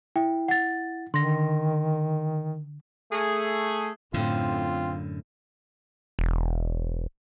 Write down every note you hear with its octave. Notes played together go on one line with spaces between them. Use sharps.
E4 G5
F#5 A6
D3 D#3 C6 A#6
A3 G#4
F#2 A2 D3 C4 F4
E1